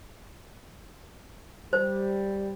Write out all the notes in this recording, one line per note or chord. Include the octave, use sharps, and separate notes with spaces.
G3 C5